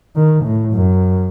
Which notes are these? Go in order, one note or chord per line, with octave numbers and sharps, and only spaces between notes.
D#3
A2
F#2